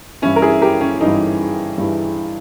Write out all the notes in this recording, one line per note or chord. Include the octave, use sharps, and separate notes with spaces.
G2 E3 C#4 E4
A#4
E4 G#4
G4 A#4
C#4
G2 E3 D#4
G2 E3